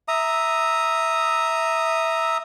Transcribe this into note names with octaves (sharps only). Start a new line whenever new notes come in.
E5 A#5 D#6